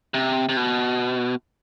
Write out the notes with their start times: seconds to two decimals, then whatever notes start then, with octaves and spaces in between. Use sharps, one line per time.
0.14 C3
0.49 C3
0.57 B2